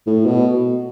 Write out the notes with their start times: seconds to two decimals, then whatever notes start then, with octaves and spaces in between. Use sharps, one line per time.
0.07 A2
0.26 B2